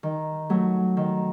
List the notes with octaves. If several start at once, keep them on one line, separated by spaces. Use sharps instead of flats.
D#3
F#3 A3
D#3